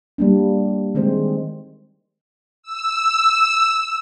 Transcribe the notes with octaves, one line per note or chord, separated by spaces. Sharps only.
G3 A#3 D4
D#3 G#3 C4 C5
E6